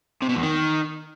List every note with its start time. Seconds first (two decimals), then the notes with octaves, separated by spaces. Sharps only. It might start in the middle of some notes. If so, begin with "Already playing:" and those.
0.22 C3
0.29 B2
0.36 E2
0.43 D#3